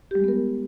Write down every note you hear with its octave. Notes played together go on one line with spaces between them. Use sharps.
G3 G#3 B3 G4 A#4